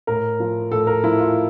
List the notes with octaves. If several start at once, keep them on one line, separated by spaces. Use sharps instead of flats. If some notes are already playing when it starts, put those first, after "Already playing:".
A2 A#4
F3
A2 A4
A#4
F3 E4
F4